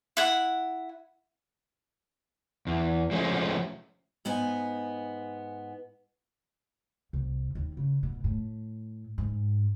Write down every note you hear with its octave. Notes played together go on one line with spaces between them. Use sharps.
E4 F#5
E2
F3 G#3 A3 C#4
G#2 B3 D#4 G#5
C2
D#2
C#3
B2
A2
G#2